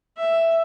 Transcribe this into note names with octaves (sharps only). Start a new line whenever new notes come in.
E5